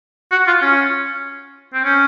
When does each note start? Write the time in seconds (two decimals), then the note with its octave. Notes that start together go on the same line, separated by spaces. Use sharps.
0.32 F#4
0.47 F4
0.62 C#4
1.74 C4
1.84 C#4